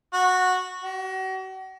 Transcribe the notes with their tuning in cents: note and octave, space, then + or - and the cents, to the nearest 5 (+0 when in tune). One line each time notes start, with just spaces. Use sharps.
F#4 -10
F#4 +40